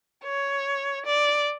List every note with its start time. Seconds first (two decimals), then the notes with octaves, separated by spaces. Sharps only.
0.24 C#5
1.06 D5